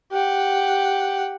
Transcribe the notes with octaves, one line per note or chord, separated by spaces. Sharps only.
G4 F#5